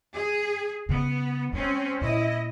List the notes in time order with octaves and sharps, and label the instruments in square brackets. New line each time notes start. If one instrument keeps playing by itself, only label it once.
[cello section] G#4
[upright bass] C#3 [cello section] B3
[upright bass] G#3 [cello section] C4 C#4
[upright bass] A#2 [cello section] E4 D#5